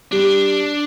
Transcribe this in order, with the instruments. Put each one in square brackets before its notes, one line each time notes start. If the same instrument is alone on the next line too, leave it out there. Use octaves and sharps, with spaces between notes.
[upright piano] G3 [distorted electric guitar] D4